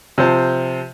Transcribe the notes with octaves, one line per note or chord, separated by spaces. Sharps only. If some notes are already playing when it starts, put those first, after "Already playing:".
C3 F3 C5 A5